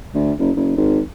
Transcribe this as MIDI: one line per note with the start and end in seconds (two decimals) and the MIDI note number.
0.15 0.33 38
0.39 0.51 30
0.56 0.73 30
0.77 1.01 32